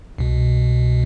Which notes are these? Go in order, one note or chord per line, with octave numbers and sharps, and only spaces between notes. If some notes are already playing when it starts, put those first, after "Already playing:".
C2 B2